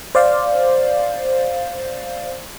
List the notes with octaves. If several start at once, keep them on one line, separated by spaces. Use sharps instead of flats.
C5 D5 F5